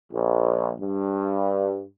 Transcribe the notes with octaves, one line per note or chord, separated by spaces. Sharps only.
A#1
G2